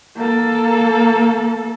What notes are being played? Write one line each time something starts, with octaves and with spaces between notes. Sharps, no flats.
A#3 A4